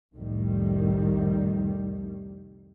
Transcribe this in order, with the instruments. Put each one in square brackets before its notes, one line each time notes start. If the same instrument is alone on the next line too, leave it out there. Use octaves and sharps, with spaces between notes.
[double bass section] C2 F2 A2 D#3 G3